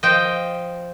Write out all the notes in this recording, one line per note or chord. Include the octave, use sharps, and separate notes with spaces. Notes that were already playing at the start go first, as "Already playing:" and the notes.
F3 D#5 G5